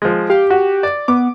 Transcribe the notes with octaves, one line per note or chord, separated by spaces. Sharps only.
F3 G#3
G4 F5
F#4
D5
B3 D6